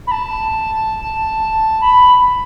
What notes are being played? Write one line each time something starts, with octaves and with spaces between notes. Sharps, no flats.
B5
A5
B5